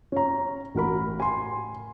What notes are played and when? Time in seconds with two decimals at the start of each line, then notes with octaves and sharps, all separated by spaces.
0.12 C#4 A#5
0.75 A1 F#4 A#4 B5
1.20 G#5 C6